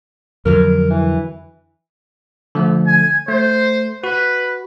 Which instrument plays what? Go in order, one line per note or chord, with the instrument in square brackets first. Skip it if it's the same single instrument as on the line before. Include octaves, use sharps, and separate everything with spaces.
[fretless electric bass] F2 D3 F#3 [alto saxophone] A#4
[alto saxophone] E3
[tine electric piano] D3 F3 A3
[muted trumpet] G#5
[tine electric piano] A3 [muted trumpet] C5
[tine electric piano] F#4 [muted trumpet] B4